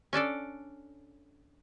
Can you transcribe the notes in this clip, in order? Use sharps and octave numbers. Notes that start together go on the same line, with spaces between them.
C#4 D4 A4 D5